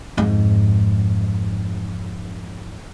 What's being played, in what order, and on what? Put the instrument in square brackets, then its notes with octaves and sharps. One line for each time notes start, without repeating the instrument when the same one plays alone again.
[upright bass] F2 G#2